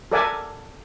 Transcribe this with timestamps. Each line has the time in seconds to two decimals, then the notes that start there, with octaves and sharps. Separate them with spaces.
0.12 A4 A#4 D5 E5 F#5 G#5